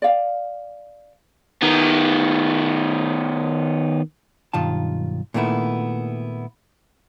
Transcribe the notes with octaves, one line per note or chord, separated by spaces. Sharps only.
D5 F5
D#3 B3
B1 G2 D#3 F4 A5
A#2 D#3 A3 B3 E4